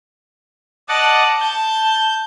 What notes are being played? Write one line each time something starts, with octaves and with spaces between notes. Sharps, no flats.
D5 D#5 F#5 A5
A5 G6